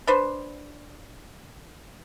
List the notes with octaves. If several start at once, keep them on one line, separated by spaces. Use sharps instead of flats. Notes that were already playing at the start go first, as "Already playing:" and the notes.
D4 B4 C5